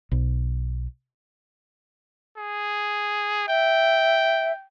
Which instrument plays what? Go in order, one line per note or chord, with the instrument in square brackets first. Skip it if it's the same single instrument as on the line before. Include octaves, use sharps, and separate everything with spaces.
[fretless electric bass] B1
[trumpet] G#4
[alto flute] E5 [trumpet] G5